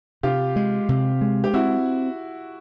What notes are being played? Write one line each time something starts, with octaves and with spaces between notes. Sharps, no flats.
C3 F4 G4
G#3
C3
G#3
G4
C4 E4 F#4